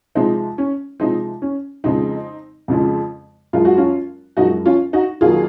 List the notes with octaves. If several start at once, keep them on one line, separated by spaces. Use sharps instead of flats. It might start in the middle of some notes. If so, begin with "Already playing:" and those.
C3 F3 G#3 C4 D#4
C#4
C3 F3 G#3 C4 D#4
C#4
F2 C#3 F3 G#3 C4 D#4
F2 C#3 F3 G#3
F#2 F3 G#3 F4
F#4
C#4 F4
F#2 F3 G#3 D#4 F#4
C#4 F4
D#4 F#4
F2 D#3 F#3 A#3 F4 G#4